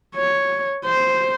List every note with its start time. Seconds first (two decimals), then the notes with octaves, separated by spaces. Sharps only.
0.15 C#5
0.86 C5